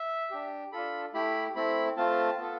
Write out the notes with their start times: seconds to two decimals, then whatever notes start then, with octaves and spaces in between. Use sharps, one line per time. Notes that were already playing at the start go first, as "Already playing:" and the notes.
Already playing: E5
0.31 D4 G4
0.72 D4 F4 A4 B5
1.14 A3 E4 G4 B5
1.55 A3 C4 E4 B5
1.97 A3 C4 F4 A5
2.38 B3 F4 A4